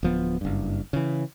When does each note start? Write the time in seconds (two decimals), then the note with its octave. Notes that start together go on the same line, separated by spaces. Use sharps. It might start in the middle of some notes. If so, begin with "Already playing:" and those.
0.03 D1 F3 B3
0.41 F#1 G2
0.93 C#3 E3